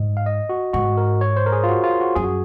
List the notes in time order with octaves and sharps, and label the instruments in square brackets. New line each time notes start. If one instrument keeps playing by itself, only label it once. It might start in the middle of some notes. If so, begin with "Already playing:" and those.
Already playing: [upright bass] G#2 [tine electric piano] D#5
[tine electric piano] F5
D#5
F#4
[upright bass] G#2 [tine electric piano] F#4
[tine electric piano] A#4
C#5
C5
A#4
G#4
F4
F#4
F4
F#4
[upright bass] F#2 [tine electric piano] G#4
[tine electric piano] F#4